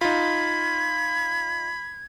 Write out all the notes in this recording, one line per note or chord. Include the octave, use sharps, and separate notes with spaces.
D#4 F4 B5 G#6